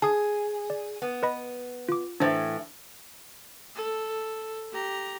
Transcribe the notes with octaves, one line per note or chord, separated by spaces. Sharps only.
G#4 A5 D#6
D5
B3
B4 D#5 B5
F4 D6
A2 E3 D4 C5 A6
A4
G4 A#5